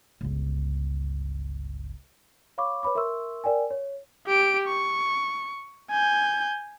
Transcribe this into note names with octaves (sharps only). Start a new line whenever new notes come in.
G1 C#2
C#5 F5 B5 C#6 D6
B4 C#5 B5 D6
A#4 E5 C6 C#6 E6
A#4 D5 G5 G#5
C#5
G4 D7
C#6
G#5 G6